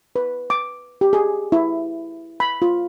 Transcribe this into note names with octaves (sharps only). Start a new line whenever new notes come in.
B4
D6
G4
G#4
E4
B5
F4